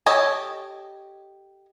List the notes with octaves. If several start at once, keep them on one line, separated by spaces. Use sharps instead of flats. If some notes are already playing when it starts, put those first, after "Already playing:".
G4 A4 C#5 D#5